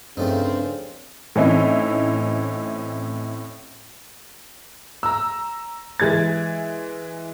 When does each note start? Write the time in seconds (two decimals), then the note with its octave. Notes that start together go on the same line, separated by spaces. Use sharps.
0.17 G2 C#3 F3 A3 C4 D4 D#4
1.35 A2 E3 C4 C#4 D#4 E4
5.03 A#5 E6
6.00 E3 G#3 G#6 A6